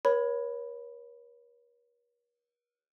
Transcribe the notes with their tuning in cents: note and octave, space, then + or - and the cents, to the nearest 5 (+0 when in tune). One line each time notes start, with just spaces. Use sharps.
A#4 +45 C#5 +0 B5 +0